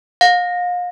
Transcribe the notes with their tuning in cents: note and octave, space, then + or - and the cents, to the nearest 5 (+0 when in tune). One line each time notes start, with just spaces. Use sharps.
F5 +35